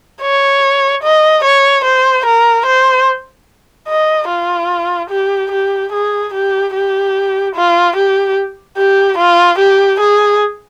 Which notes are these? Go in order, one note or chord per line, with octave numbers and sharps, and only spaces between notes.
C#5
D#5
C#5
C5
A#4
C5
D#5
F4
G4
G4
G#4
G4
G4
F4
G4
G4
F4
G4
G#4